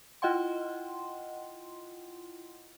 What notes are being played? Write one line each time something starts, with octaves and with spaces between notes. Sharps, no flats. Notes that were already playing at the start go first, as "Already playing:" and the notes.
E4 F4 D#5 F#5 G5 C6